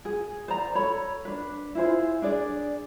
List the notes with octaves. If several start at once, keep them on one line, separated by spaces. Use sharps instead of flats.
G#4
C5 D5 A#5
A4 C#5 B5
D4 B4
E4 F4 G#4 C5
D4 G#4 D5